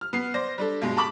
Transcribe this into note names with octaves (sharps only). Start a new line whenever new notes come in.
F6
B3 C7
C5 D5 A#6
G3 D4 A4
G2 B2 G#3
A5 B5 D6 B6 F#7